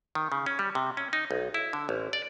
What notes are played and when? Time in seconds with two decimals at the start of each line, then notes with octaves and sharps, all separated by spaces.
0.15 D#3
0.32 C#3
0.46 C#4
0.59 G3
0.75 C3
0.97 C#4
1.13 D#4
1.31 B1
1.54 E4
1.73 D3
1.89 A1
2.13 D5